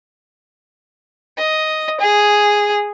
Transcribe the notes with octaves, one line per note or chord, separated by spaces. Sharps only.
D#5
G#4